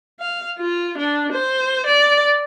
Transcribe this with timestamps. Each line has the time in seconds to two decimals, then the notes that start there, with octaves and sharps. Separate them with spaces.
0.20 F5
0.58 F4
0.98 D4
1.32 C5
1.86 D5